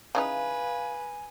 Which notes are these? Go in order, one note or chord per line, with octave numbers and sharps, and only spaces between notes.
C#3 E3 D#4 B4 F5 G#5